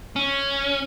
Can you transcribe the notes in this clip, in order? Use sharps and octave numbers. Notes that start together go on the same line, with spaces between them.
C#4